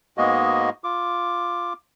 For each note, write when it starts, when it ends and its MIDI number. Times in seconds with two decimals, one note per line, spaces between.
0.18 0.70 44
0.18 0.70 56
0.18 0.70 58
0.18 0.70 59
0.18 0.70 66
0.18 0.70 75
0.84 1.73 65
0.84 1.73 86